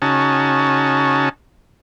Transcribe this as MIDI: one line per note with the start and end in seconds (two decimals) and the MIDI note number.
0.02 1.29 49
0.02 1.29 61
0.02 1.29 63
0.02 1.29 66
0.02 1.29 81